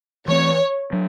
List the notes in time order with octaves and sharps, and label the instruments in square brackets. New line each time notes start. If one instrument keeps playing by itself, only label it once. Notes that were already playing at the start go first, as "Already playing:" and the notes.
[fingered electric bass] E3 A3 C4 [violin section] C#5
[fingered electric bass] F#3 D4